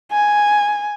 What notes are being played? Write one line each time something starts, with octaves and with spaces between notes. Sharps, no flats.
G#5